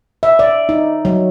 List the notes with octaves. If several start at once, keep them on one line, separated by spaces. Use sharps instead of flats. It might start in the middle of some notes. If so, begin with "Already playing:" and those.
E5
D5
D#4
F#3